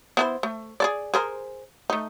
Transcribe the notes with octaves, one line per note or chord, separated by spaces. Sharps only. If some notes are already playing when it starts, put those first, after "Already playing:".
B3 E4 C5
A3
G#4 A4 D5
G#4 A#4 C5
A3 D#4